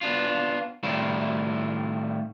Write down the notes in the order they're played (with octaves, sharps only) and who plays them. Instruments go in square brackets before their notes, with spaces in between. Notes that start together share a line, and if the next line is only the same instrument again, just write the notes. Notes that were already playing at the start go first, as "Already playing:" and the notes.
[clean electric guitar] B3 D4 F4
A2 D#3 G3 A3 E4 F4